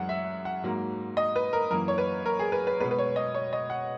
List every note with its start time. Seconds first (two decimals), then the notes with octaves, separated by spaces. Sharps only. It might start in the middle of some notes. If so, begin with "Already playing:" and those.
Already playing: F#2 E3 G#3 F#5
0.09 E5
0.45 F#5
0.63 G#2 F#3 A#3
1.17 D#5
1.36 B4
1.53 A#4
1.71 F#2 E3 A#3 A#4
1.88 C#5
1.98 B4
2.26 A#4
2.39 G#4
2.52 B4
2.67 B4
2.80 B2 G#3 B3 B4
2.91 B4
2.99 C#5
3.16 D#5
3.34 C#5
3.53 D#5
3.70 F#5